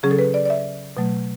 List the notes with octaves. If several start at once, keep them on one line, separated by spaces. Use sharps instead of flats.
C#3 F#3 C#4 G#4
A4
B4
D5
D5
E5
B2 F#3 A3